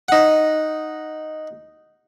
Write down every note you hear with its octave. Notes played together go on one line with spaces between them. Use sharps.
D#4 F#5